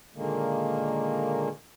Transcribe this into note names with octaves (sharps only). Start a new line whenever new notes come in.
A#2 D3 D#3 G#3 A#3